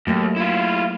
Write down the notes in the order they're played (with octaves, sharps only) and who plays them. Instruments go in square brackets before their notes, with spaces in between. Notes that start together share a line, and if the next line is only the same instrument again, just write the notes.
[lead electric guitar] D#2 [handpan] F#3 A3 A#3
[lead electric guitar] E4 F4